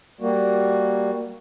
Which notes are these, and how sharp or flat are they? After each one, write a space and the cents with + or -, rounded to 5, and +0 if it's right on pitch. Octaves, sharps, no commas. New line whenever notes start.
G3 +0 A#3 +0 F#4 +0